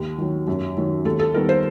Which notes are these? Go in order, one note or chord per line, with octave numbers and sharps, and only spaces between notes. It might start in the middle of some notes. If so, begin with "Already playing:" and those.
Already playing: D#2
D#3 F#3
F#2
D#3 F#3
D#2 A4
A4
D#3 G3 B3 A#4
C5